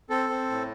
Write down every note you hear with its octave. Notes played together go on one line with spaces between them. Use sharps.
C4 A4
C4
A2